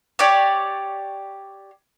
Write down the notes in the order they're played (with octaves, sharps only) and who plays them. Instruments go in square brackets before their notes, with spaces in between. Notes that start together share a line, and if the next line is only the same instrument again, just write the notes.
[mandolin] G4 C#5 D5